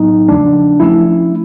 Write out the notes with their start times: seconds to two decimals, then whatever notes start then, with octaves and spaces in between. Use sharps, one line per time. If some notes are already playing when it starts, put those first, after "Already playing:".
Already playing: A2 F#3 B3 D#4 E4
0.28 E2 C#3 F3 A3 D4
0.80 F3 A3 C#4 E4